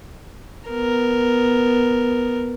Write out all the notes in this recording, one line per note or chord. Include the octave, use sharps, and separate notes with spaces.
B3 A#4